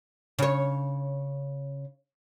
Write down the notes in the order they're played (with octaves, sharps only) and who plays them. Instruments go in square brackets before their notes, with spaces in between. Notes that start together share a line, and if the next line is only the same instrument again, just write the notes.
[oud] C#3 C#5